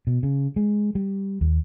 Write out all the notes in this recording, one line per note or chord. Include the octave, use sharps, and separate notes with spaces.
B2
C#3
G#3
G3
D#2